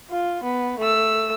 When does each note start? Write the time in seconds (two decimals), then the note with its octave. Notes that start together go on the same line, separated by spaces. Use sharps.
0.11 F4
0.43 B3
0.79 A3 E6